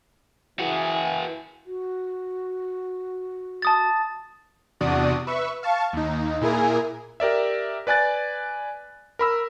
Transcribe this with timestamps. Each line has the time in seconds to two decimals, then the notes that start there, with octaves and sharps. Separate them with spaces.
0.60 E3 F#4 G#4
1.66 F#4
3.62 A5 D#6 A6
4.81 E2 C3 D4 F#4 D5 D#6
5.27 B4 E5 C#6
5.63 F5 A5 C#6
5.93 D#2 D#4
6.41 A#2 E4 G#4 A#4 G#5
7.20 G4 A#4 D5 E5
7.87 B4 D5 G#5 F#6 A6
9.19 A#4 B5 E6